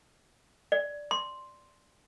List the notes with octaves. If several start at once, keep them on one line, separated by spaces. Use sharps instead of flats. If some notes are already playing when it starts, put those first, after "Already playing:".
D5
C6